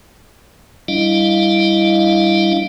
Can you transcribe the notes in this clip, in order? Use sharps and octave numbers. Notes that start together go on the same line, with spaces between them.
G3 D4 E4 D#5 F5